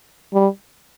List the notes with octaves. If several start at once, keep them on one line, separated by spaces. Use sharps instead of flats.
G3